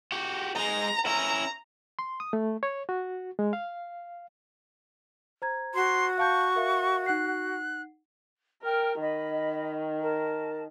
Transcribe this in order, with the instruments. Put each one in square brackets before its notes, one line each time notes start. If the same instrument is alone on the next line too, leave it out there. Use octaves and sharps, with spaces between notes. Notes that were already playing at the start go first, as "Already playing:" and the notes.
[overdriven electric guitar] F#4 G4
[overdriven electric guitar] G#3 D#4 [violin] A#5
[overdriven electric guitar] C#4 E4 [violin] A#5
[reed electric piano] C6
D#6
A3
C#5
F#4
G#3
F5
[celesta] C5 A#5 G#6
[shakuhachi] F#4 [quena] C6
[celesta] F5 A5 G6 [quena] C#6
[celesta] A#4 E5 F5
[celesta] D#4 F#5 C7 [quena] F#6
[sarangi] A#4 [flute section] G5 F6
[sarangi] D#3 [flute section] D#5 B5
[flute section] A#4 A5